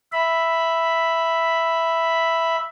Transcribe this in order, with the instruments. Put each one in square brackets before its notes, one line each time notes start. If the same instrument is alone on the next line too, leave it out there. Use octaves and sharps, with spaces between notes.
[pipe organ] E5 B5